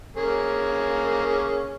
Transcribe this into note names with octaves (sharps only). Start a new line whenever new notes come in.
A#3 C#4 G#4